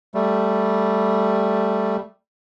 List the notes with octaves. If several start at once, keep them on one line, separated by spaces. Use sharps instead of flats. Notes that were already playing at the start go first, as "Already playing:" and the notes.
G3 A3